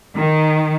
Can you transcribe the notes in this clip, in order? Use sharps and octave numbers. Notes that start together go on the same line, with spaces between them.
D#3